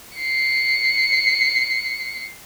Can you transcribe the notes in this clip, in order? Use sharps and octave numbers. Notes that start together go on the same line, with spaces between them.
C7 C#7